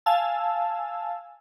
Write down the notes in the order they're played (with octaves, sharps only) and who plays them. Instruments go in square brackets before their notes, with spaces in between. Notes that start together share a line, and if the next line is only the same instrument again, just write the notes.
[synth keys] F5 G#5 A5 E6